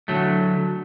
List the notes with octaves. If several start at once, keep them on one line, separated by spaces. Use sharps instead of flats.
D3 F#3 A3